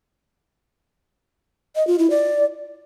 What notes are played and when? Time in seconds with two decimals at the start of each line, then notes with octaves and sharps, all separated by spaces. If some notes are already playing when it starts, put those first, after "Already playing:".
1.76 D#5
1.87 F4
1.99 E4
2.10 D5